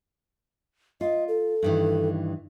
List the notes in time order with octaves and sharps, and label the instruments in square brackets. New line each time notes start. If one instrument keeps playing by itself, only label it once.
[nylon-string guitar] F4 [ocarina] D#5
[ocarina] A4
[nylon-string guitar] G2 D#3 E3